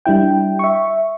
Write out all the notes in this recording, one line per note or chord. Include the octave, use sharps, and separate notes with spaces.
G3 D4 E4 G5
E5 C#6